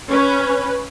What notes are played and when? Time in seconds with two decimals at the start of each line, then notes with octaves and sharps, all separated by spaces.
0.11 C#4 B4